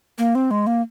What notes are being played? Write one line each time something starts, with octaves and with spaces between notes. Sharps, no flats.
A#3
C4
G#3
A#3